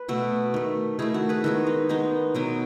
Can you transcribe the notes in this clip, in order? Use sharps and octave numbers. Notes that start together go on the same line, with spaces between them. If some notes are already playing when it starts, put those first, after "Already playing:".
Already playing: B4
B2 A3 F#4 A4
D#3 A3
D#3 A3 E4 G#4
F#4 A4
G#4 B4
D#3 G#3 B3 F#4 A4
D#4
D#3 G#3 B3 D#4
B2 F#3 B3